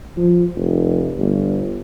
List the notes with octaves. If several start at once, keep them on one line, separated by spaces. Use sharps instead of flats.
F3
F1
G1